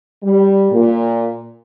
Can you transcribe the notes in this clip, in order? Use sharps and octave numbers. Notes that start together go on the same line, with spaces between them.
G3
A#2